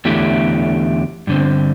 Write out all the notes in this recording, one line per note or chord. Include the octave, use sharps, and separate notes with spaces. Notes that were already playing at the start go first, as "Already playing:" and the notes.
E2 D3 A3 E4 G4
G2 D3 C4